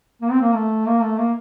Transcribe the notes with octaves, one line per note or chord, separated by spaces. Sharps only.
A#3
C4
A#3
A3
A#3
A3
A#3